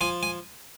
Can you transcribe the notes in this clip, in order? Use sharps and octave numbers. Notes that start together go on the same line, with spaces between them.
F3 G#5
G#5